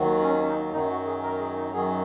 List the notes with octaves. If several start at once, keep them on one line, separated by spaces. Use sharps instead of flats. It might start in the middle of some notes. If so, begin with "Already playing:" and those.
Already playing: D#2 D#3 F#3
C#4
C#4
D#4
F#2 D#3 F#3 D#4
F#4
G#4
A#4
G#4
D#4
F#2 D#3 F#3 G#4